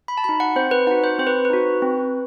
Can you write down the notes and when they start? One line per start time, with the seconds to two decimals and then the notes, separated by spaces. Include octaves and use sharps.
0.08 B5
0.17 A5
0.24 D#4 F#4 B5
0.40 F#5
0.56 C4 C5
0.71 B4
0.87 D#4 F#4 F#5
1.04 C5
1.18 C4 C5
1.27 B4
1.45 B4
1.50 D#4 F#4
1.82 C4